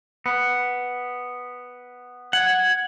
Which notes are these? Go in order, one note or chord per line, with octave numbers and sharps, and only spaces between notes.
B3
F#5 G#6